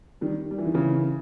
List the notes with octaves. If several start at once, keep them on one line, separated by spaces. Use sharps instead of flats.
D#3 G3
G3
E3
D#3
C#3 E3